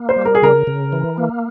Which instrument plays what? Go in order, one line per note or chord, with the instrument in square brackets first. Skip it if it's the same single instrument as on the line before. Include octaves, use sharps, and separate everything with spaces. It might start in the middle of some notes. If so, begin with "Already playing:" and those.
Already playing: [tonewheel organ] A#3
[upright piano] C5
[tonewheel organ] G3
[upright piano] A#4
G#4
[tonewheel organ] C#3 [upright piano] A#4
[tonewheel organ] C#3
E3
A#3